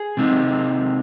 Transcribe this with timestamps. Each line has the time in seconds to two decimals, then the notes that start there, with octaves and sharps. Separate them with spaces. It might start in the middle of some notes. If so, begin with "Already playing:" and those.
Already playing: G#4
0.17 C3 G#3 C4 D#4